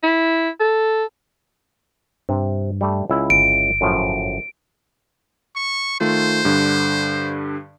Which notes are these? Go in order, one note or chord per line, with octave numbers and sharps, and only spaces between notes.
E4
A4
G2 C3
G3 A3
C#2 E4 G#5
G1 D7
F#2 A2 F3
C#6
D#3 A3 F4 C5
G2 D3